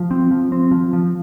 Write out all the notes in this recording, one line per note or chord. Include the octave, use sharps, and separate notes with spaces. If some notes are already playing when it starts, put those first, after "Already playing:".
Already playing: F3
C4
F3
C4
F3
F3